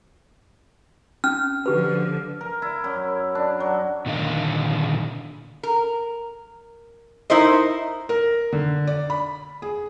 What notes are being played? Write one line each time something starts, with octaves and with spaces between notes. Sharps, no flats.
C#4 F6
D3 F3 G4 B4
A#4
E4
F#2
D4
F#3
A#2 D3 D#3 D#5 F5
A#4
D#4 E4 A#4 C5 D#5
A#4
D3
D5
B5
G#4